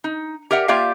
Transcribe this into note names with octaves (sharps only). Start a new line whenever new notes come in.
D#4
G4 A#4 D5 E5 F#5
A#3 F4 G4 D5 E5 F5